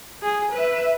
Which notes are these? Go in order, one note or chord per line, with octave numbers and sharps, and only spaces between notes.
G#4
B4 E5